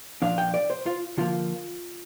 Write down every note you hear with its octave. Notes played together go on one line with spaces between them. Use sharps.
A#2 F3 D4 F5
G5
D5
C5
F4
D3 F3 A#3 F4